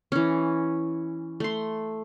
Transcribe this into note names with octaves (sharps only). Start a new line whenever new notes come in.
E3 C#4
A3 C6